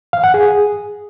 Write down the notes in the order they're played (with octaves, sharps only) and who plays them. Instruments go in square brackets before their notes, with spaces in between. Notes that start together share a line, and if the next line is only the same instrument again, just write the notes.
[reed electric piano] F5
F#5
G#4